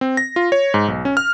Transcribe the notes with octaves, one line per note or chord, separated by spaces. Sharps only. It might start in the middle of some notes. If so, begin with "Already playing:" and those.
C4
A#6
F4
C#5
G#2
B1
C#4
F6